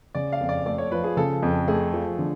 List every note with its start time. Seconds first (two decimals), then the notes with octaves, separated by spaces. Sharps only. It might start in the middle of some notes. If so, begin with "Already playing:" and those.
0.15 C#3 D5
0.32 F5
0.41 F2
0.49 D5
0.66 A3 D5
0.78 C#5
0.92 F3 B4
1.04 G#4
1.17 C#3 A4
1.43 F2
1.68 A3 G#4
1.93 F3
2.19 D3